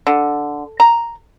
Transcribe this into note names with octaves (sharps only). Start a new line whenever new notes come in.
D3
A#5